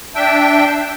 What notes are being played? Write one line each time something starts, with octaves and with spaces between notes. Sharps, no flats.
D4 E5 G5